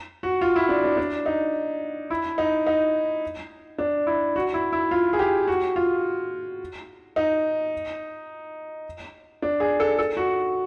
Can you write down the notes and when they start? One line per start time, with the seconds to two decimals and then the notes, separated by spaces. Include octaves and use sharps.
0.23 F#4
0.41 F4
0.56 E4
0.69 D4
0.84 D4
0.97 D4
1.26 D#4
2.10 E4
2.38 D#4
2.67 D#4
3.78 D4
4.07 E4
4.36 F#4
4.54 E4
4.72 E4
4.91 F4
5.13 G#4
5.19 G4
5.47 F#4
5.76 F4
7.16 D#4
9.42 D4
9.60 G#4
9.80 A4
9.99 A4
10.17 F#4